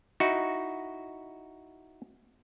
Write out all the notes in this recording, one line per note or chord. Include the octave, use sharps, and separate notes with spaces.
D#4 E4 F#4